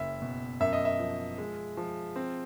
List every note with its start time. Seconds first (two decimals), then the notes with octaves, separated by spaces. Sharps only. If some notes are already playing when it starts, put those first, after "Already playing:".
Already playing: F#1 E5
0.22 B2
0.60 F#2 E5
0.73 D#5
0.85 E5
1.00 F3
1.38 G#3
1.77 F3
2.16 C4